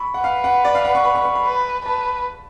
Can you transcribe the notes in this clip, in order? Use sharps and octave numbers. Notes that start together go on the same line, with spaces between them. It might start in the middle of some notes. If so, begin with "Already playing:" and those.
Already playing: B5 C#6
F#5
B4 F5
F#5
D5
F5
F#5
C#6
B5
C#6
C#6
B5
B4
B4 A5